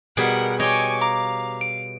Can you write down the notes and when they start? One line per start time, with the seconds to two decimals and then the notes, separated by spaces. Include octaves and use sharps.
0.17 B2 G3 G#4 A#4 F#5 D7
0.60 C#5 D#5 G5 G#5 C#6 D6
1.01 F5 A#5 D6
1.61 D7